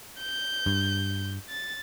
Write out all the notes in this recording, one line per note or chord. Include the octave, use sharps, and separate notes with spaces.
G6
G2
A6